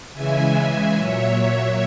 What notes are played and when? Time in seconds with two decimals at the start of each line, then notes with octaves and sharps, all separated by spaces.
0.14 C#3 E3 G#3 E5 G#5
0.96 A#2 F#3 C#5 E5